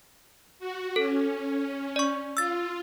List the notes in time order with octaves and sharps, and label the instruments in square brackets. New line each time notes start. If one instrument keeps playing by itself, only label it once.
[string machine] F#4
[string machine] C#4 [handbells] A4
[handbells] D5 C#6
[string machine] F4 [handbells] E6 A6